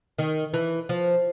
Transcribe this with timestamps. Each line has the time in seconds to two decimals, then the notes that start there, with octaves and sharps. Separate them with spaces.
0.19 D#3
0.54 E3
0.89 F3